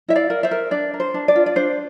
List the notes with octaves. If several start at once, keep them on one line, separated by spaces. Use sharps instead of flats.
E4 E5
D5 F5
A#4
C5 E5
A#4
D4 D5
A#4
C5
D4
D5
F4
D5
D4 C5